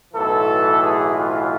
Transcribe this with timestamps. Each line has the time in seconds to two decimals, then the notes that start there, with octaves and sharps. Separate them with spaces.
0.14 B1 A2 E3 A4
0.82 G#4
1.16 F4